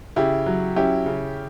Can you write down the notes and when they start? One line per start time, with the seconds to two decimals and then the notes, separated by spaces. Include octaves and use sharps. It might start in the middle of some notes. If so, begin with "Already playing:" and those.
0.16 C#3 E4 G4
0.46 F#3
0.76 C#4 E4 G4
1.06 C#3